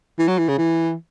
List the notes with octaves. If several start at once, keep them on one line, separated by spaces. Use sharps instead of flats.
E3
F#3
E3
C#3
E3